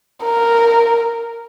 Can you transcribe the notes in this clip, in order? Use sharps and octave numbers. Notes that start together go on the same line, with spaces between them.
A#4